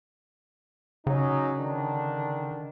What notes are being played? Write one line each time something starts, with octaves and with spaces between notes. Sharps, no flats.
C#3 F#3 C#4 D#4
D3 D#3 D4